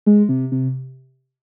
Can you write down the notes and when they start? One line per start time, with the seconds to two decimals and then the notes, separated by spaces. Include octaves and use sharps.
0.06 G#3
0.29 C3
0.52 C3